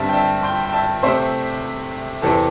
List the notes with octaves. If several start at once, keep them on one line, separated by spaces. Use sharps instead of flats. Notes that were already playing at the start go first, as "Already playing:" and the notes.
Already playing: G2 D3 C4 E5 A5
G5
E5 A5
G5 C6
G5
E5 A5
C3 A3 C4 C5 E5
E2 C3 E3 C4 A4